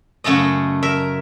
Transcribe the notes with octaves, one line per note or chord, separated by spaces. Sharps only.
F#2 C#3 A3 A4 D#5
A#4 E5